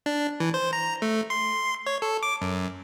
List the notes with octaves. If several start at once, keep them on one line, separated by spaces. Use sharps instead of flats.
D4
E3
C5
A#5
A3
C6
C#5
A4
D6
F#2